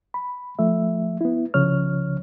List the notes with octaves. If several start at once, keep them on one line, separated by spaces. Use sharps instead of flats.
B5
F3 A3 E5
B3 E4
C2 C#3 F3 C#5 F6